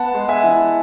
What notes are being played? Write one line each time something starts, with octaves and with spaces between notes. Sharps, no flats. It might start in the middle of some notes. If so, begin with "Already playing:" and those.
Already playing: B3 F#5 A5
G#3
E5 G#5
E3